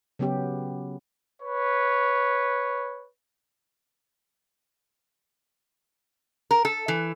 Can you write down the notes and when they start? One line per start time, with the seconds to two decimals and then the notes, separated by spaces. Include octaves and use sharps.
0.19 C#3 F#3 B3 C#4 G4
1.42 B4 C#5
6.51 A#4
6.65 A4
6.88 E3